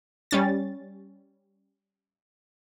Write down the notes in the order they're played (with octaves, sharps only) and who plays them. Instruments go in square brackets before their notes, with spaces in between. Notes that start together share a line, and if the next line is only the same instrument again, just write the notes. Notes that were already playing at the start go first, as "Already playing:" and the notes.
[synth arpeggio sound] G3 C#4 A6